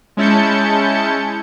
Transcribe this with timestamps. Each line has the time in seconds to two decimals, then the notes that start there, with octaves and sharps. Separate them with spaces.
0.17 G#3 C#4 E4 A5 G6 C#7